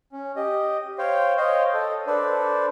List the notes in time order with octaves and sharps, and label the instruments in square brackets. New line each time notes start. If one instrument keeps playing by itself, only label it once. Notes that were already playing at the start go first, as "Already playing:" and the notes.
[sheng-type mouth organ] C#4
G4 D#5
C5 C#5 F5 G5
C5 C#5 D#5 F5 G5
A4 D#5
D4 A4 B4 C5 D5